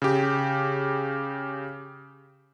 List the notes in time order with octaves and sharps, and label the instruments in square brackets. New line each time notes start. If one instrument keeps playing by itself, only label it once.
[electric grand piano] C#3 G4